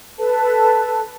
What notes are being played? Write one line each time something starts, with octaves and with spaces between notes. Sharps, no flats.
A4 B4 A5